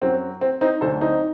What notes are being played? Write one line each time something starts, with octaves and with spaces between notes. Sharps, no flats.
F#2 F#3 C4
C4
C4 D#4
D2 D3 F#3 A4 C5
C4 D#4